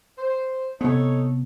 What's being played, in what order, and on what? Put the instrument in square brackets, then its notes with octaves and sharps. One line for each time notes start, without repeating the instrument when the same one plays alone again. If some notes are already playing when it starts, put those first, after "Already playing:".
[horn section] C5
[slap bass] C3 B3 [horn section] D#4 A4 C#5